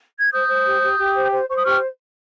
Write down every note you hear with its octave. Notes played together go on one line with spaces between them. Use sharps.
G#6
C5 D#6 G6
C5
G4
G4
G4
C5
C5
C5 C#6
D#6
G4 C#6 F6